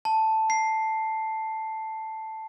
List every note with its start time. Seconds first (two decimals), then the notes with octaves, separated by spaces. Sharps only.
0.05 A5
0.50 C7